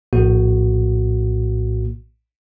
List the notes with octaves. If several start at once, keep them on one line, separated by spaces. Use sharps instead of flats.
A#1 A2 A#3 F#4